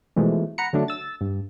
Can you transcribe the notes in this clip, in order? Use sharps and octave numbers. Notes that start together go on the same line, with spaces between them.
B2 E3 F3 G#3 A3
F#5 A#5 B5 C#7
D3 F#3 A3 D4
E6 A6
G2